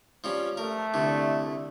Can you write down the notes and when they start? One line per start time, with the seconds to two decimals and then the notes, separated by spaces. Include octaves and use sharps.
0.24 F3 G3 C#4
0.57 A3 A#4
0.94 C2 D3